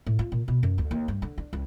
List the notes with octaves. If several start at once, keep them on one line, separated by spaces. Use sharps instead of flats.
A2
F4
A#2
B2
F#2
D2
D#2
G2
D3
D4
C#2